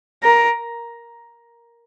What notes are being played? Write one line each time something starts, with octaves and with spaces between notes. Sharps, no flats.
A#4